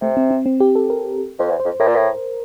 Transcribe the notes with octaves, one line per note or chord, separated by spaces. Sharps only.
C3 A3
C4
C4
C4
G4
A4
A#4
F2 C5
E2
C5
F2
A2 A#4
A#2
A2